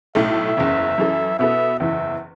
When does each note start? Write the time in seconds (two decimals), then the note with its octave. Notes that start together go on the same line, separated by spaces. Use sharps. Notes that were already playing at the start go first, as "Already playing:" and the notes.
0.15 B1 A2 A3 E5
0.57 F#1 E2 C#3
0.98 F#2 E3 C#4 A4
1.39 B2 B3 E4 A4 E5
1.80 F#1 E2 E3 E5